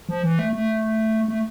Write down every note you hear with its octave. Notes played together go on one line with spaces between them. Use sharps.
F3
E3
A3
A3
A3